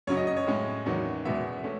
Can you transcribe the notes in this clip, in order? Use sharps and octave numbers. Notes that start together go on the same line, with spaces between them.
F#2 C#3 F#3 C#4 C#5
D#5
D#5
C#5
A2 G#3 C#4
E2 D#3 F#3 C#4
E2 B2 G#3 B3 E5
A3 C#4